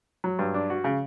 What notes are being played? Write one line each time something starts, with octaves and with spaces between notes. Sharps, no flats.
F#3
G2
D4
F#4
C#3